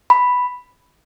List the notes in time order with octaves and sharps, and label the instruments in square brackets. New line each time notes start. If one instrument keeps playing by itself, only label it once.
[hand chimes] B5